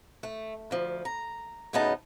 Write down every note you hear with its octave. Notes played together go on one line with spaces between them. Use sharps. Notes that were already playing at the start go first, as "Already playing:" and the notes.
A3
D2 F3
A#5
D2 A2 C#3 B3 D#4 A5